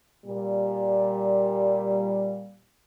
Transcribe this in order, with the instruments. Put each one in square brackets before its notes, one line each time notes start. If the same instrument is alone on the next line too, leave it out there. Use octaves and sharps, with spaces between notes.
[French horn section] A#2 G3